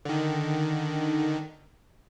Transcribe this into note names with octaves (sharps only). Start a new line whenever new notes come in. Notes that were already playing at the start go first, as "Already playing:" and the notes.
D3 D#3